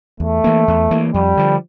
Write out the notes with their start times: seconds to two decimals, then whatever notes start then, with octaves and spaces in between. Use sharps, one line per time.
0.20 E2 A3
0.44 E3 A#3
0.68 E2
0.91 E3 A#3
1.14 F2 G3
1.37 D3 F3